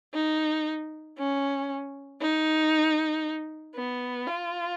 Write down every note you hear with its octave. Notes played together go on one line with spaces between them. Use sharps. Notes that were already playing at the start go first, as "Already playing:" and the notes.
D#4
C#4
D#4
B3
F4